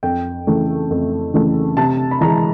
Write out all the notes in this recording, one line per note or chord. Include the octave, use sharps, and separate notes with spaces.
F2 G5
C#3 E3 A3
F2
C#3 E3 A3
C3 A5
B5
E3 G#3 A#5